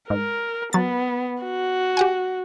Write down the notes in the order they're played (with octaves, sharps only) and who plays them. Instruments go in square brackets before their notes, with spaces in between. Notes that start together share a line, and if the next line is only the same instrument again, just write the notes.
[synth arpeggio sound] G#2 [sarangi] A#4
[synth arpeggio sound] F#3 A6 [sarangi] B3
[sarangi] F#4
[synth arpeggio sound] G4 F#5 G#5